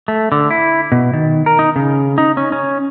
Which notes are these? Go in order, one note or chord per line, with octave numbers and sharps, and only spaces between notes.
A3
D3
E4
B2
D#3
A#4
D#4
C#3
D#4
C#4
C#4